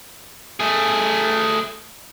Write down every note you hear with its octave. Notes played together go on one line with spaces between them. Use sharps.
A3 G#4